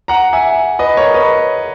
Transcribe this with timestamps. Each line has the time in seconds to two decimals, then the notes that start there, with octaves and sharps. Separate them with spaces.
0.08 F#5 A#5
0.33 E5 G#5
0.79 B4 D#5
0.97 A#4 C#5
1.14 B4 D#5